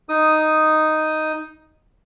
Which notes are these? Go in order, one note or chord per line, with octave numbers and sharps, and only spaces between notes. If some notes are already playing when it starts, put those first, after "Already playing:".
D#4 D#6